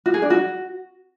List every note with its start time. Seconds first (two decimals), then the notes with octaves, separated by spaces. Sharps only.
0.06 F#4
0.14 G#4
0.22 D4
0.30 F#4